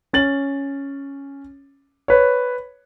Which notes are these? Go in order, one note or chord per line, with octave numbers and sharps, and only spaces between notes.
C#4 A6 F#7
B4 C#5